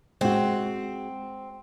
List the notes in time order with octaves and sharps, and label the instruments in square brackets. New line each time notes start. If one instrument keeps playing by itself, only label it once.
[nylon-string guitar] G#3 F#4 [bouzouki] C4